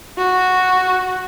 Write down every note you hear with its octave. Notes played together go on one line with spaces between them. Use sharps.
F#4